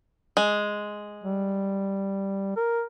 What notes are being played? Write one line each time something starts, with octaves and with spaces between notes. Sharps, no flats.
G#3
G3
A#4